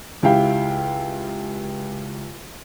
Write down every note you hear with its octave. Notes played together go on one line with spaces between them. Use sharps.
C#2 E4 G4 F5 G5